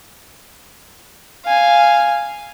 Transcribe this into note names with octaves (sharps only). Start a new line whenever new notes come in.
F5 G#5